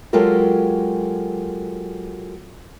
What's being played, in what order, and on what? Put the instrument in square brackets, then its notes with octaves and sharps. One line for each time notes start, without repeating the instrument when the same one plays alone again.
[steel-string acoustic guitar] F#3 G#3 F4 G4 A4 A#4